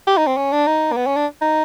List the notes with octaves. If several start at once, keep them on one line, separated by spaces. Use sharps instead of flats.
G4
D#4
C4
C#4
D4
D#4
A#3
B3
C#4
D4
D#4